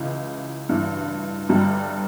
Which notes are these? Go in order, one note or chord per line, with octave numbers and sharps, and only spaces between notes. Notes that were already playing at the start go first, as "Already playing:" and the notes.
Already playing: C#2 C#3 E3
A1 G2 E3
G1 G2 D3 G3